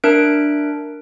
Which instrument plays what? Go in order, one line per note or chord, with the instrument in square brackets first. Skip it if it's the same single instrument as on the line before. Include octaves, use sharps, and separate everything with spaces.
[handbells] D4 A#4 E5 F#6 D7